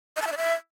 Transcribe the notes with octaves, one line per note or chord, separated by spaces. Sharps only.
D#5
A5
E5
D5
E5